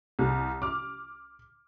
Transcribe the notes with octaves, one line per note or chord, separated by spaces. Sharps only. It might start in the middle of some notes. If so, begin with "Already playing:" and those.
C2
D6 F6